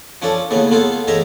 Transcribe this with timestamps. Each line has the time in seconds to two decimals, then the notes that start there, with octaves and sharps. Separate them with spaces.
0.22 F3 C#4 D4 A4
0.51 D#2 A2 C#3 A3 B3
0.71 A3 B3 F4 G#4 A4
1.08 A2 E3 D#4 G#4 E5 A#5